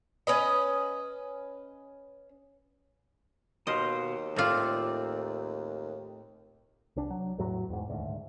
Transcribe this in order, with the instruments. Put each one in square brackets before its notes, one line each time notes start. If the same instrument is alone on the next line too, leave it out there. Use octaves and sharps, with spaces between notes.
[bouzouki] C#4 B4 D#5
[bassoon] D#2 [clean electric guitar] B2 C5 F5 [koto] D#5
[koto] A2 F4 [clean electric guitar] A3 C4 D5
[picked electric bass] C2 D4
F#3
E2 A2 F#3
E2 G#2
D#1 D2 G#2